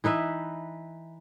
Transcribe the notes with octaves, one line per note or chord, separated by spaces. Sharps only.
E3 D#4 B4 E5